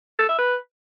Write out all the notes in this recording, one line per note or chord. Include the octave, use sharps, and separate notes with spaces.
A4
E5
B4